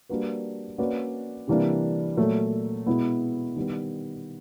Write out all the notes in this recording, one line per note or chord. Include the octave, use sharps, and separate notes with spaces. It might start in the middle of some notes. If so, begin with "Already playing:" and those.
G3 A#3 D4 F#4 B4
A#3 C#4 F#4 B4 D5
C3 E3 G3 A#3 D4
A#2 F#3 A3
B2 G#3 B3 E4
D#3 G3 B3